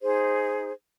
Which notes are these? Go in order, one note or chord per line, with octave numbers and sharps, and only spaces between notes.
D#4 G#4 C5